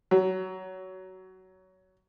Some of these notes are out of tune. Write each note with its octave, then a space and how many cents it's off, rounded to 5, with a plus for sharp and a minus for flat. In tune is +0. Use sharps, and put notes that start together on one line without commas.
F#3 +20